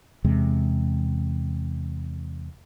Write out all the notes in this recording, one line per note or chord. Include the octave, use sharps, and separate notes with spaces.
E2 C3 G#3